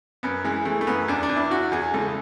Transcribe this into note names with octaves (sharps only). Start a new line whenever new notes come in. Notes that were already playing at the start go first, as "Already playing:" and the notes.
F#2 B3
E3 G#3
E3 A3
A3
F#2 B3
E2 D4
D4
E2
E4
E2 F#4
E2 G#4
C#2 A4